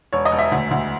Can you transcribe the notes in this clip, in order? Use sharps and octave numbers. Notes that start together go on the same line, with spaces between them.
E1 C#5
D#5
E1
E5
D2
D2